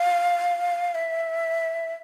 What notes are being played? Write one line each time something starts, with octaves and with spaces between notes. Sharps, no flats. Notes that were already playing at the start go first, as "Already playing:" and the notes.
Already playing: F5
E5